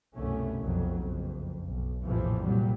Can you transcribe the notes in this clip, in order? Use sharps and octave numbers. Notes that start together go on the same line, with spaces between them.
C2 F#2 B2 D3 A3 C#4
F1 B1 F2 F#3
F#1 F2
B1
A#1 F2 A2 C3 E3 F3
C2 A#2 F#3 G3